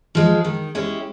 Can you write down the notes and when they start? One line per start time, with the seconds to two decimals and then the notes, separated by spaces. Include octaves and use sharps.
0.15 F3 G#3
0.44 D#3
0.75 G#3 C#4 E4 G4